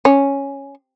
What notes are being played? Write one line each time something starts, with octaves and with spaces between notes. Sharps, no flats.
C#4